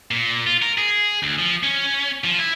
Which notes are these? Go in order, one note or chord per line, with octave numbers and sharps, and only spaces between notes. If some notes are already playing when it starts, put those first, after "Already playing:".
A#2
F4
A#4
G#4
D2
F3
C#4
F3
E4